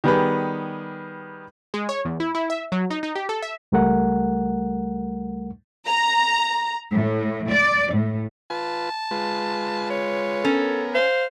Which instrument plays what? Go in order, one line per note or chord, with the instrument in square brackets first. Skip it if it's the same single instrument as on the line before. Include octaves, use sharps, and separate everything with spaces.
[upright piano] D#3 G3 B3 G4 G#4 B4
[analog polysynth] G#3
C#5
E2
E4
E4
E5
F#3
D#4
D#4
G4
A4
E5
[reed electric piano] C#2 G3 A3 A#4 F#5
[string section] A#5
A2
D5
A2
[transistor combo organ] F4 B4 [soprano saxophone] A5
[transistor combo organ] G#3 F4 B4
[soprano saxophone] C#5
[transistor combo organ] B3 A#4 [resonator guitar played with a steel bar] C#4 [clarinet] A4
[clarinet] C5 [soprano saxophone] F5